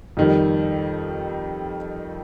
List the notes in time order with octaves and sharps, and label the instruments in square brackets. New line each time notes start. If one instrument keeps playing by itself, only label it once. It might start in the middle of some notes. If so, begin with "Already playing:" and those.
[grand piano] F2 D#3 G3